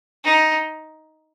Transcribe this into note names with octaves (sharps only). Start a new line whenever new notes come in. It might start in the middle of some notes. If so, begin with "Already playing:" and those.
D#4